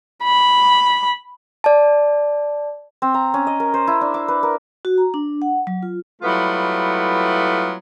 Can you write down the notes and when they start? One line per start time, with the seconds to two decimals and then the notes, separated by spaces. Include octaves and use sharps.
0.23 B5
1.64 D5 A5
3.02 C4
3.14 A#5
3.34 C#4
3.47 D#5
3.60 A#4
3.74 C5
3.87 E4
4.01 D4
4.14 D6
4.28 B4
4.43 A#4
4.85 F#4
4.98 A#5
5.14 D4
5.42 F#5
5.67 F#3
5.83 F4
6.22 F#3 G3 A3 B3 E4 F4